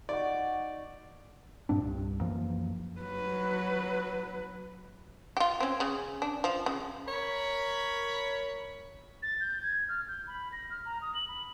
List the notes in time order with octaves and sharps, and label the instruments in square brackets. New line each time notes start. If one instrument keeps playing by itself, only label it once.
[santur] D#4 F#4 [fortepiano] D5
[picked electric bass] G2 A#2 C4 D4
C2 G2
F#2 E3 F3 A#3
[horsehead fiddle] F#3 B4
[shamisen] F4 G4
C4 C#4
C#3
D4
F3
C#3
[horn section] A#4 C#5 B5
[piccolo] A6
G6
G#6
F6
G6
B5
A#6
F6
A#5
D#6
F#7
B5